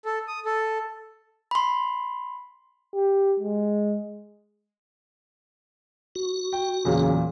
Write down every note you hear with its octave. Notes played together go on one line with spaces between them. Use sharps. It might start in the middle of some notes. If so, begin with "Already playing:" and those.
A4
D#6
A4
B5 C6
G4
G#3
F#4
G5
E2 A#2 C#3 F#3